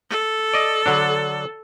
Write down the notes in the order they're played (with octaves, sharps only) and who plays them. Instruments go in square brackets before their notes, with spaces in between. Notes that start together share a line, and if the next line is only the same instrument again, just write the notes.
[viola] A4
[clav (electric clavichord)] D5 D#5
D3 F#3 D4